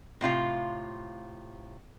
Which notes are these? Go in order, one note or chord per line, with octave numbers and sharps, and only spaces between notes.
A2 C3 F4 F5